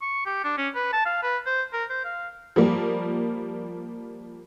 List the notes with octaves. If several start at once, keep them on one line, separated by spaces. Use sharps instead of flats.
C#6
G4
D4
C#4
B4
A5
F5
B4
C5
A#4
C5
F5
F3 G3 A#3